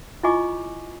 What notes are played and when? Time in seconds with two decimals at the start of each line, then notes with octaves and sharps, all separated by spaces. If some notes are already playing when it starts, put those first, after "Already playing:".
0.23 E4 F4 D#5 G#5 C#6 D6